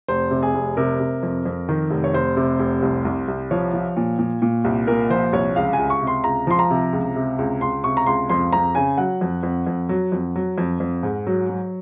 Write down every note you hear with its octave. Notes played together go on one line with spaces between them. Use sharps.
F1 C5
C3
G#4
F1
C3 A#4
C3
F2
F2
D#3
F1
C#5
F1 C5
C3
F1
C2
C2
C2
F3 C#5
F3
A#2
A#2
A#2
C2
A#2 A#4
F3 C5
C2 C#5
C#2 F5
G#5
C#2
C#6
C3
C6
C#2 A#5
F3 C6
A#5
C3
C#2
C3
C#2
C#2 C6
C3 C#6
A#5
C#2 C6
F2 C6
F2 A#5
C#3 G#5
F#3 F#5
F2
F2
F2
F#3
F2
F#3
F2
F2
G#2
F#3
F#3